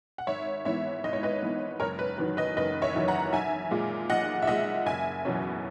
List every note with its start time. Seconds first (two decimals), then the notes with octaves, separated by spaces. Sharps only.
0.18 F#5
0.27 G#1 C#5 E5
0.65 G#2 E3 B3 C#5 E5
1.04 G#1 D#5
1.13 C#5
1.23 B4 D#5
1.42 G#2 E3 B3
1.80 F#1 A#4 C#5
1.99 B4
2.18 E2 D#3 F#3 B4
2.37 B4 D#5
2.57 F#1 B4 D#5
2.82 C#5 E5
2.95 E2 D#3 F#3
3.08 F#5 A#5
3.33 B1 E5 G#5
3.71 A#2 G#3
4.10 B1 D#5 F#5
4.42 E5
4.47 A#2 G#3 D#5 F#5
4.86 F#1 E5 G#5
5.25 E2 B2 F#3 C#4